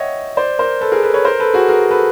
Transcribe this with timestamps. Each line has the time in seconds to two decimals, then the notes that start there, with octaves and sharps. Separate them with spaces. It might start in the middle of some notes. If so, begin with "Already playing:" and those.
Already playing: C#5 D#5 E5 F#5 G5
0.37 C5 D5
0.59 A#4 C5
0.81 A4 B4
0.92 G#4 A#4
1.03 A4 B4
1.14 B4 C#5
1.25 A#4 C5
1.39 A4 B4
1.54 F#4 G#4
1.68 G#4 A#4
1.91 A4 B4